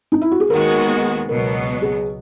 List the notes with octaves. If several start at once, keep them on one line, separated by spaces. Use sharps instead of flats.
D#4
E4
F#4
G#4
D#2 D#3 G#3 B3 F#4 A#4
C#2 B2 F#3 B3 A#4
G#4